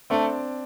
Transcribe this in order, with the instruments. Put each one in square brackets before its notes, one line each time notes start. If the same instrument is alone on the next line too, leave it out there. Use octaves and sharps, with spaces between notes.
[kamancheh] A3 [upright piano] C4 D4